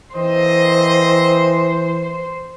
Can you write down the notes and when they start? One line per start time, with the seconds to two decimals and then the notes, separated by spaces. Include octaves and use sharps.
0.16 E3 A#3 C4 C5 D#5